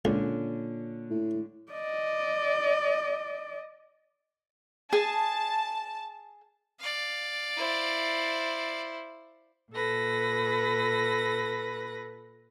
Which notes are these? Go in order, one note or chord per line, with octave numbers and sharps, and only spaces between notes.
C#2 A#2 D3 C#4 D4
A2
D5 D#5
G#4 A5
D5 F5
E4 C5
A#2 A4 B4 A#6